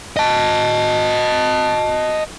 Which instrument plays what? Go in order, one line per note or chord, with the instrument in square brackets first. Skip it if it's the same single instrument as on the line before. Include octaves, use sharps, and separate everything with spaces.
[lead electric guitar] D#5 A5